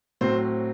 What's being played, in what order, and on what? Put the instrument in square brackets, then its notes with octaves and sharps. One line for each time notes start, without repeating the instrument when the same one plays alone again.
[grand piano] A2 F#3 C4 C5